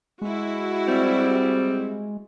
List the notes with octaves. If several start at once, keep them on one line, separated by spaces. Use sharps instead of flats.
G#3 E4 F#4
G3 C4